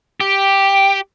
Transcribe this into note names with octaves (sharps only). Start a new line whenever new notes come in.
G4